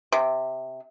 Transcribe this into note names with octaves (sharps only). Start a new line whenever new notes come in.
C3